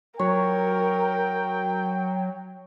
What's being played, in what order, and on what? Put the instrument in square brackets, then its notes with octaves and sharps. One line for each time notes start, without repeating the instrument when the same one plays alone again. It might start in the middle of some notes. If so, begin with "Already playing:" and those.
[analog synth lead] F#3 [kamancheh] A#4 [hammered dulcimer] C#5 [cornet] G5